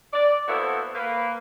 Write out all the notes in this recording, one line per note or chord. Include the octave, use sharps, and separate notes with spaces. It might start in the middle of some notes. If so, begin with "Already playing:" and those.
D5
A#3 B3 E4 F#4 A4 C5
A#3 B4